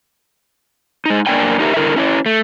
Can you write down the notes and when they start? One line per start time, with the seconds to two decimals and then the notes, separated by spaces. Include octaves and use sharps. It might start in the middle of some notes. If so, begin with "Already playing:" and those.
1.06 G#3 D#4
1.26 F#2 A#3 D4 D5 G5 G#5
1.60 D#4 G4 A#4 E5
1.76 D3 E4 A#4
1.96 C#4 E4 C#5
2.26 A3